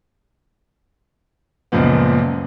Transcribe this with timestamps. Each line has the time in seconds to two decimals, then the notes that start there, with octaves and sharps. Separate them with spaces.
1.72 C#2 F#2 A#2 F3 B3